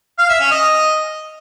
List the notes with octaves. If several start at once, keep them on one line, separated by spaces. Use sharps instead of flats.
F5
E5
C#4
D#5